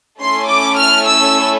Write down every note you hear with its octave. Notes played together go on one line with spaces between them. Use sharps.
A3 C#4 E4 A4 C6
D6
F6
E6